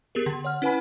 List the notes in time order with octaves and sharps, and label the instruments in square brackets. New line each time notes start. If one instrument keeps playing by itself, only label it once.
[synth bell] B3 G4 G#4 A#4
D3
C#5 F#5 F6
C#4 E4 B4 F#5 G#5 B5